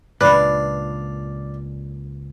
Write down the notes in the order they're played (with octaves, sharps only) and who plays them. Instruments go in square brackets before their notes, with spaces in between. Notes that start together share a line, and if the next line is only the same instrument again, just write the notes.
[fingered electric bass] C#2 A#2 [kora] D4 [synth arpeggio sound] B4 [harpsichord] D5 F5